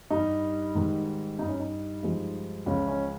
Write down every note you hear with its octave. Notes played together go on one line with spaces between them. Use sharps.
G2 G3 D#4
G#2 D#3 G3
G2 G3 D#4
C#4
D#4
G2 F3 G#3
C#2 C#3 F3 G#3 C#4
C#4